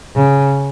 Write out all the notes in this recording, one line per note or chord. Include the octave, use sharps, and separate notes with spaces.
C#3